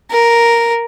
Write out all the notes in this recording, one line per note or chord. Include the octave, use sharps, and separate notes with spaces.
A#4